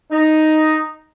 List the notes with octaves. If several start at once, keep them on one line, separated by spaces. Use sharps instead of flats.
D#4